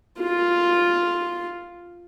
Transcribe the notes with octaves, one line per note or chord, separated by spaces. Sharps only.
F4